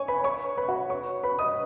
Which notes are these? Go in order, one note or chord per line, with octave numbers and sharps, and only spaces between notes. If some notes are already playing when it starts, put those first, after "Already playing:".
Already playing: C#5 G#5 C#6
B4 B5
C#5 C#6
B4 B5
F#4 F#5
C#5 C#6
B4 B5
D#5 D#6